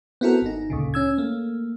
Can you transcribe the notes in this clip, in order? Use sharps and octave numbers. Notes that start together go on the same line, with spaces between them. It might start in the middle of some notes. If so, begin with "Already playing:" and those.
B3 C4 E4 F#4 A4 A#4
G1 D#4
D2 A#2 C#3
C#4 E6 G#6
A3 A#3